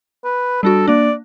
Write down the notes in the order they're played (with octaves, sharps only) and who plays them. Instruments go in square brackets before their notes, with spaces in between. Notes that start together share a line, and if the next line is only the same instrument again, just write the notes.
[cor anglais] B4
[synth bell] G3 D4 F#4 [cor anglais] A4
[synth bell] A#3 D4 [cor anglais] D5